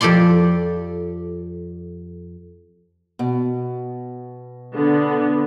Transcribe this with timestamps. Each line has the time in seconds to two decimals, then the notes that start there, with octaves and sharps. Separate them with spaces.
0.01 F2 G4 A4 D5 C6
3.19 B2
4.73 D3 B3